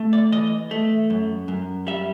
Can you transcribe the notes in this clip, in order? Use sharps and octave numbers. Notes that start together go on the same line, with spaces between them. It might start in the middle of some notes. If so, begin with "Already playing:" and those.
Already playing: A3
D5
E3 D#5
A3
F#2
F#2
G3 E5